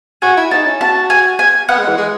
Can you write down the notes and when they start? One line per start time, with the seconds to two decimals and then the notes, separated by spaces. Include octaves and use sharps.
0.22 F#4 G#5
0.37 E4
0.51 D#4 A5
0.66 C#4
0.81 F#4 A5
1.10 G#5
1.39 G#5
1.69 B3 F#5
1.78 G#3
1.88 E3
1.98 G#3